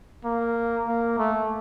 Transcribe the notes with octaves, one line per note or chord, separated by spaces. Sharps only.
A#3
A#3
A3